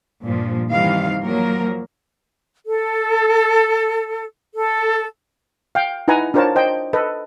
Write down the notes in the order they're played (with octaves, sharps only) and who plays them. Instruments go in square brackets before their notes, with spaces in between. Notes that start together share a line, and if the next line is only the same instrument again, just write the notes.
[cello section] G2 A#2 F3
G2 C3 D#3 E3 G3 F5
F3 F#3 A#3 A#4
[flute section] A4
A4
[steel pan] F5 G5
D#4 E4 B4 F#5 G#5 A#5
D4 F4 A#4 C5 C#5 A5
C5 D#5 G5
A4 B4 D#5